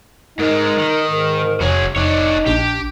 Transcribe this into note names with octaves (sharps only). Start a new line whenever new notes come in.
G#2 G#3 D#4 A#4
D#3
G#2 A#4
F1 F#3 G#4 C#5
F1 D4 D#4 C#5 D6
A#1 D4 G4